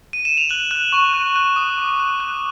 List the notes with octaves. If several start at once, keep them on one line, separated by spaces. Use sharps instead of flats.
D#7
E7
F7
F#6 F#7
F#6
C#6
F#6
F#6
D#6
D6
F#6
F#6